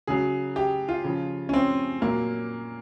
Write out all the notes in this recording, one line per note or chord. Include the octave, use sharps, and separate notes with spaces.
C#3 F#3 G#4
G4
F4
C#3 F3
C#4
C4
A#2 F#3 A#3